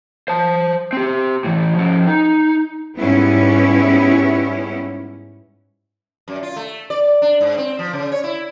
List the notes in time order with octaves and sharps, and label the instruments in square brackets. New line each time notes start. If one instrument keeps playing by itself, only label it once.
[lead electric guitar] C5 A5
C4 G4
A2 E3
F3 C#4
D#4
[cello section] G#2 G3 B3 C#4 E4
[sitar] F#2
F4
A3
D5
D4
G#2
C4
F3
C#3
C#5
E4